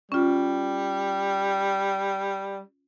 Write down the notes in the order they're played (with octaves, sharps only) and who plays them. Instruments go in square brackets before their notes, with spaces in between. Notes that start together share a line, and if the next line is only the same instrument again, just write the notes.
[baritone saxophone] G3 [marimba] C#4 F4